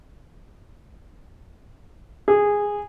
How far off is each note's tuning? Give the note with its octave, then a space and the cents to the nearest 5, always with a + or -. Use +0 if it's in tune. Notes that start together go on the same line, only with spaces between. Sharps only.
G#4 -10